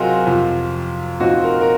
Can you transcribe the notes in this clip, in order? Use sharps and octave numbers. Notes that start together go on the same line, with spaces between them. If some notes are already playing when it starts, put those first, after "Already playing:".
Already playing: C3 F#3 C4 D#4 F4 F#4 G#4 A#4
F2 C3 F3
A#2 F3 C4 D#4 F#4
A#4
A#4